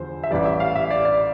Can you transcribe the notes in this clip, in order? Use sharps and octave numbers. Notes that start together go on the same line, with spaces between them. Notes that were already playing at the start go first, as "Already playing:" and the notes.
Already playing: E2 D3 F3 C5
E5
A1 A2 E3 G3 D5
E5
F5
E5
D5
D5